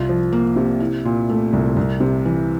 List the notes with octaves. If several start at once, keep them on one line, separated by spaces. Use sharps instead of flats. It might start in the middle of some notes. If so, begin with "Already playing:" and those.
Already playing: C2 F4
F3
A#3
C3
E4
A#2
A3
C2
C2
C3
E3